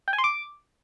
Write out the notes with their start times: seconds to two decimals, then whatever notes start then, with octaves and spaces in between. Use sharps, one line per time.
0.08 G5
0.13 G#5
0.18 C6
0.24 D6